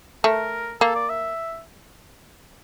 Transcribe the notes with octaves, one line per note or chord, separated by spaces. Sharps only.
A3 A#4
A#3 A4
D5
E5